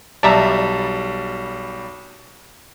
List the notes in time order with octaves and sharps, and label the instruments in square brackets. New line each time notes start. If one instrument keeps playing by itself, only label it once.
[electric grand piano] B1 G3 A5 [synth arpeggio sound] D5 E5 A#5